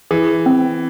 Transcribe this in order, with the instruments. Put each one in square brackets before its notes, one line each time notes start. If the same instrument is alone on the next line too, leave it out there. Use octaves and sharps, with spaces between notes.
[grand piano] E3 [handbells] G#4
[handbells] C4